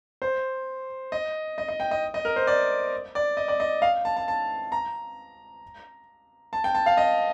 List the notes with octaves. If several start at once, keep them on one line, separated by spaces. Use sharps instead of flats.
C5
D#5
D#5
D#5
G5
D#5
D#5
A#4
C5
D5
D5
D#5
D5
D#5
F5
A5
A5
A5
A#5
A5
G5
A5
F5
D#5